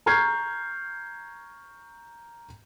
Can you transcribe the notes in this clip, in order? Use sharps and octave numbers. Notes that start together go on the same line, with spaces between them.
A#5 C#6 F6 G6 G#6 C7